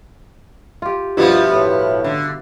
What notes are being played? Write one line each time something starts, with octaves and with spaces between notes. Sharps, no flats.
F4 G4
G2 B2 F3 G3 B3 E4 F4
A2
D3